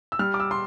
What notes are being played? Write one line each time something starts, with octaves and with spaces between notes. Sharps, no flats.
E6
G3 F6
D6
E6
C6